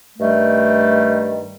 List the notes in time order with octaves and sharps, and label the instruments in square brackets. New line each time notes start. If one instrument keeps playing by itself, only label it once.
[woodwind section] G2 D#3 G3 A3